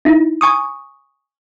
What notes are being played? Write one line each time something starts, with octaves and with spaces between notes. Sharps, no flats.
D#4 E4
G#5 C#6 D#6